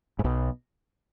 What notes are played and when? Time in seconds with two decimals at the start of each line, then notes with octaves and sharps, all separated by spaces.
0.19 G#2
0.24 B1 B2